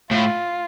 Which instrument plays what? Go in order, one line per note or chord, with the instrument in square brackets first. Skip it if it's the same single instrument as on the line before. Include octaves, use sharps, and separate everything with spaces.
[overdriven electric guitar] A2 [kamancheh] F4